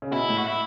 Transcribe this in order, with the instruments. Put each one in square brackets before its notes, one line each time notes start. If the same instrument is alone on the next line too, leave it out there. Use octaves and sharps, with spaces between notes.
[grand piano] C#3
[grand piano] B2 [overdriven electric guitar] E4
[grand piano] A2
[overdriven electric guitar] F#4
E4